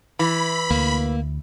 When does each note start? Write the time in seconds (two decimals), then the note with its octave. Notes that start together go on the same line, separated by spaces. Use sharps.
0.19 E3 B5
0.71 D2 A#3